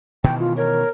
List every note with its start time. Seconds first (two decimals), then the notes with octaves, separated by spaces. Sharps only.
0.24 B2 D#3 E3 G5
0.40 F4
0.57 A#4 C#5